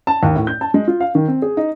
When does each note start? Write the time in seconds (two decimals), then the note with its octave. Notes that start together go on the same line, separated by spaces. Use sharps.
0.07 A5
0.23 D#2
0.35 A2
0.47 G6
0.61 A5
0.74 G#3
0.88 F4
1.00 F5
1.15 D#3
1.28 C4
1.42 G#4
1.57 D#4